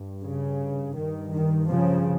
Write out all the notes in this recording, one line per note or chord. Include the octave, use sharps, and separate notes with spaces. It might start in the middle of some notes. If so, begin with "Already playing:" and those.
Already playing: G2
C#3
G2 D#3
D#3
C#3 F3